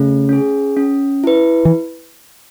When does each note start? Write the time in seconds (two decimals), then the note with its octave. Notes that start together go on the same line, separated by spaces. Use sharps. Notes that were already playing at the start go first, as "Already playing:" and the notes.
Already playing: C#3 A3
0.29 C#4 G#4
0.77 C#4
1.24 E4 B4
1.65 E3